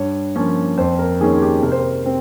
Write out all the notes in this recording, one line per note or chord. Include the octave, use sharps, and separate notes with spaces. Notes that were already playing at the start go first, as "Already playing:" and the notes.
Already playing: G2 C#5
F3 A#3 C#4
F2 C5
A#4
D#3 A#3 C#4 G#4
G4
C3 A#4
C5
A#4
C4